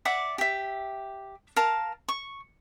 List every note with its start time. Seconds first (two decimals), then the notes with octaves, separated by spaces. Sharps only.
0.05 D5 E5 F#5 D6
0.38 G4 E5
1.56 A#4 F5 A5
2.08 C#6